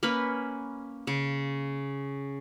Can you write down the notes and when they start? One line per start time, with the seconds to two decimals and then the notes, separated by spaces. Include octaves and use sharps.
0.03 A#3 C#4 B4
1.07 C#3